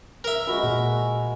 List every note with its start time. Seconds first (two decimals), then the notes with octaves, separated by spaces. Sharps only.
0.24 A#4 E5
0.47 G#3 F#4 B5
0.64 A#2